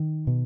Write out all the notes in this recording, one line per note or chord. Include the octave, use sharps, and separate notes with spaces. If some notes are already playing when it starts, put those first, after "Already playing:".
Already playing: D#3
B2